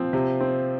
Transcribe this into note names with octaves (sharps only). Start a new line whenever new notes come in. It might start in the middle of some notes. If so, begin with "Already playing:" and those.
Already playing: F3 C4
C3
C4